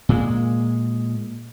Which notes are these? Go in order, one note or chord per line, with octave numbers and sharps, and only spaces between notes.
A#2 G#3